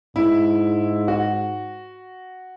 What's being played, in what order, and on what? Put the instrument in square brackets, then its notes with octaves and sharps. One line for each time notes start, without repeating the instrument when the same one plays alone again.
[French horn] G#2 [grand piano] E4
[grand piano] F#4